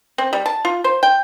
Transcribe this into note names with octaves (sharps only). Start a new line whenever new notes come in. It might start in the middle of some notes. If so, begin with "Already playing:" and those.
C4
G3
A5
F4
C5
G5